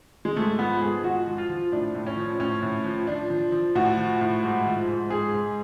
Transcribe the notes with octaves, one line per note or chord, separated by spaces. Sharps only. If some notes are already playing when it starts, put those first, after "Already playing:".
G#3
G#2 A3
F3 B3
G#2 G#4
F3 F#4
F3
F4
F3
A2 D4
A2
C#4
F3
A2 C#4
A2
F3
F3 D4
F3
F3
A2 F#4
F3
A2
G#2
F3
G#2
G#2 G#4
G#2